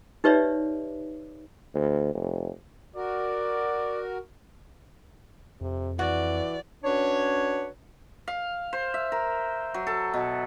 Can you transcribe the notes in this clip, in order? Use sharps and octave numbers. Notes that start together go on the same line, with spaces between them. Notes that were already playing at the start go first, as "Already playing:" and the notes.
D#4 G4 B4 C#5 D5 E5
D2
F1
F#4 A#4 D5
F2 C3
E3 F#4 D5
C#4 D4 F#4 B4 C#5
F5
C5
E5
A#4
F#3
A4
B2